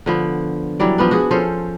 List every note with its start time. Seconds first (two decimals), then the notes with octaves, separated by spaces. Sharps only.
0.06 D3 F3 B3
0.80 E3 F#3 G3 D5
0.98 F3 B3 D4
1.11 F#4 G#4
1.31 F3 C#4 A4 C5